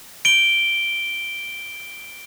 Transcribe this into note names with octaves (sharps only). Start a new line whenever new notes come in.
D7 G7